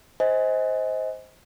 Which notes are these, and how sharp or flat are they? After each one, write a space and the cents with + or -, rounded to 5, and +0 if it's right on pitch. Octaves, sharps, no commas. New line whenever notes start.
C5 +0 D#5 +25 G#5 -5